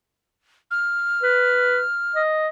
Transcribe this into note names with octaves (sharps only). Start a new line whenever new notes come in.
F6
B4
D#5